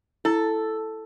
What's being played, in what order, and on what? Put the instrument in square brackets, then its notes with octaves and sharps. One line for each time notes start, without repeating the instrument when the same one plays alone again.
[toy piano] E4 [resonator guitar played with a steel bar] A4